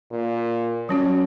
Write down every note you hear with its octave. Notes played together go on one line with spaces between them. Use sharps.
A#2
F#3 C#4 F#4 C#5